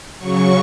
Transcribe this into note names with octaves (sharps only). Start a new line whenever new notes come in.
C#3 F#3 C#6